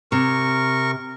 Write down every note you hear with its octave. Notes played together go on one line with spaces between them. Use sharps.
C3 A#4 C#6